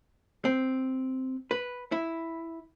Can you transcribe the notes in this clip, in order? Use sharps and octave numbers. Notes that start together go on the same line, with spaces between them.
C4
B4
E4